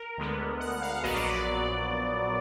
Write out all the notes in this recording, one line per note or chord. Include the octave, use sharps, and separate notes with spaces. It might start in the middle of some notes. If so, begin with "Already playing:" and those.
Already playing: A#4
D2 D3 G#3 B3
F#5
F#5
F5
F5
A#1 A#2 F#3 B3 D#5
D5